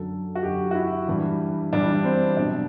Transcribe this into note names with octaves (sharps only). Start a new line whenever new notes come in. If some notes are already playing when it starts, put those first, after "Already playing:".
Already playing: F#2 D3 F#3 A4
F#4
F#2 D3 F#3 G4
F#4
E4
G2 E3 G3
G2 E3 G3 D4
C4
B2 F#3 D4